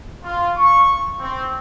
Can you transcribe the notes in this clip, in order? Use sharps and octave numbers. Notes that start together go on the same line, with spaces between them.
F4
C#6
C4